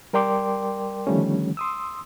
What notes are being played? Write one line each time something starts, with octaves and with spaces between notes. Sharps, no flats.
G3 A#4 D5 G5 C6 D6
D3 D#3 F3 G3 A3 C#4
C6 D#6 E6